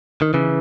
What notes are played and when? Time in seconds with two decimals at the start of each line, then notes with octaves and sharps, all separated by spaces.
0.22 D#3
0.34 C#3 E3